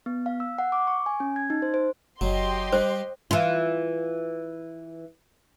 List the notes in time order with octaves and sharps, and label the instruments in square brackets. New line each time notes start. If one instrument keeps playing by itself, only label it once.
[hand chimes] B3
F5
E6
F#5
D6
C#6
G#5
C#4
G#6
D#4
C5
C5
[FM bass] F#1 [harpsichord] F#3 [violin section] G4 D#5 C6
[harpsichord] G3 [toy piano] C5
[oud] E3 F4